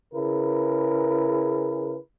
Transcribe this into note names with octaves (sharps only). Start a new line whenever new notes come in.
C#3 E4 G#4 A#4 B4